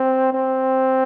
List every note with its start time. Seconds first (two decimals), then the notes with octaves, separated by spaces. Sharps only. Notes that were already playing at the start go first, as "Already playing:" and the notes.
Already playing: C4
0.33 C4